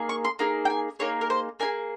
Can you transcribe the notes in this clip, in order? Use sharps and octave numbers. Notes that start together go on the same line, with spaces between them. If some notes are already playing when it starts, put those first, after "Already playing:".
Already playing: A#3 D#4 G#4
C#6
C6
A#3 D#4 G#4
G5
G#5
A#3 D#4 G#4 C#5
A#4
C5
A#3 D#4 G#4 G#5